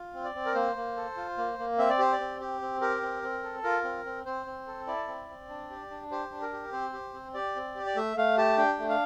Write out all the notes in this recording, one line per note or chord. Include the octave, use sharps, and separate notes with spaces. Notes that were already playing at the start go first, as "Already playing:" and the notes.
Already playing: F4
C4
D5
C4
A#4
A#3 C5
A#3
A4
F4
A#3
A#3
C4 E5
D5
G4 C5
D5
C4
G4
C4
G4 A#4
C4
C4
A4
F4 A#4
C4
C4
C4 C5
C4
A4
E4 D5
C4
C4
D4
G4
D4
G4 C5
D4
A#4
G4
C4 C5
G4
C4
G4 D5
C4
G4
D5
A3 E5
A3 F5
G4 A5
D4 G5
A3
F5